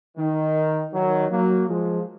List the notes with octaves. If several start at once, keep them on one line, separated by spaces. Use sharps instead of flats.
D#3
D#3 F#3
F#3 A#3
F3 G#3